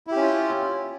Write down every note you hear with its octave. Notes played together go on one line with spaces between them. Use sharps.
C#4 E4 F4 G4